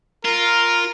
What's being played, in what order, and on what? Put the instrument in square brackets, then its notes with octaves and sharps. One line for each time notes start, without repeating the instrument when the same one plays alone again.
[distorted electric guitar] F4 [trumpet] A#4